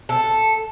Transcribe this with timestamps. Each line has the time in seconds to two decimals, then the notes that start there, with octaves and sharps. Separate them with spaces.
0.09 A4